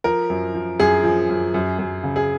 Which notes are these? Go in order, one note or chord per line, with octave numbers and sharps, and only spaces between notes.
F3 A#4
F#2
F3
F#2 G#4
F3
F#2
F#2
F#2
C#3
G#4